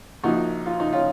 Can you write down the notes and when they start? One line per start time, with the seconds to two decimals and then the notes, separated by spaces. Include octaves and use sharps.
0.23 A#1 A#2 F3 D#4 F#4
0.66 F4
0.80 D#4
0.93 C#4 F4